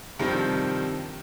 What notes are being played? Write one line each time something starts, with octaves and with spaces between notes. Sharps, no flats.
G2 C3 D#3 F3 G3 C4